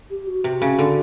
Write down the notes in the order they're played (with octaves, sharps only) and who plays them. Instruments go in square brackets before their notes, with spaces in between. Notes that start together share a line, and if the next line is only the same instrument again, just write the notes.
[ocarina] G4
F#4
[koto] C3
C#3
D3